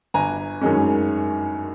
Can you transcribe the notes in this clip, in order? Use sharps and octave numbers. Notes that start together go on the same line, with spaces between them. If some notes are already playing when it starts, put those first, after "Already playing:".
G1 G#5 A#5
F#2 D#3 G#3 C#4